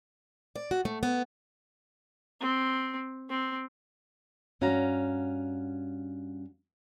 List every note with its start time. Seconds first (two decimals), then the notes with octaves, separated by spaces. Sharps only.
0.56 D5
0.71 F#4
0.85 A3
1.03 B3
2.40 C4
3.30 C4
4.61 G2 C#4 F#4 F5 A#5